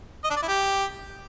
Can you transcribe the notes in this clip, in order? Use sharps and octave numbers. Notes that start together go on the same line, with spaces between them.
D#5
D4
D5
E4
G4